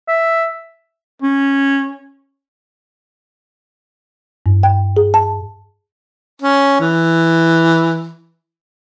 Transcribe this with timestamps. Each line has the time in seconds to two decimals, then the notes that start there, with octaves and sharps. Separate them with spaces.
0.08 E5
1.22 C#4
4.46 G2
4.63 G5
4.96 G#4
5.14 A5
6.42 C#4
6.80 E3